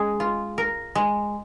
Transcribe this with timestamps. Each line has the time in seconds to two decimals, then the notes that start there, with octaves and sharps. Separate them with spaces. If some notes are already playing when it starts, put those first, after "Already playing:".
Already playing: G#3 G#4
0.20 F4
0.58 A#4
0.95 G#3